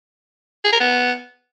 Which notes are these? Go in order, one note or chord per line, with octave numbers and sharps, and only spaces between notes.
G#4
A#4
B3